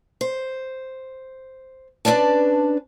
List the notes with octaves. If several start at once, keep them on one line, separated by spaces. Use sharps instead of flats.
C5
C#4 D4 F4 B4 D5 A5